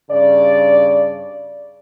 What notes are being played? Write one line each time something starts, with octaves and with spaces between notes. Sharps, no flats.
G2 C#3 D5